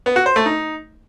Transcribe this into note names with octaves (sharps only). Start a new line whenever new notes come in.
B3
F#4
C5
A3
D#4